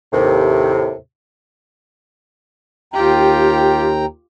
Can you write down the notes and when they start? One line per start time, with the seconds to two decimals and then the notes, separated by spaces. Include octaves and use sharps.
0.12 D#2 A2 C3
2.93 D#2 F4 G4 G5 A#5